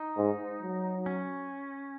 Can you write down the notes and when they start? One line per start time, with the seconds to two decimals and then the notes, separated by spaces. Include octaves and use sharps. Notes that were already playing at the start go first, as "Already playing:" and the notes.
Already playing: D#4
0.17 G#2
0.62 F#3
1.06 C#4